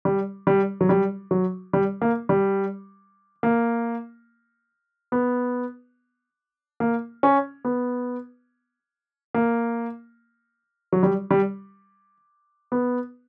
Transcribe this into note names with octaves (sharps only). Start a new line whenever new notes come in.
G3
G3
F#3
G3
F#3
G3
A#3
G3
A#3
B3
A#3
C#4
B3
A#3
F#3
G3
G3
B3